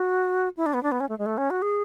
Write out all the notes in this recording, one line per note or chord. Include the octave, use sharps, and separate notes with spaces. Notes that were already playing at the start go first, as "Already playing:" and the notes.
Already playing: F#4
E4
D4
B3
D4
B3
C#4
A3
G#3
A3
C#4
F#4
G#4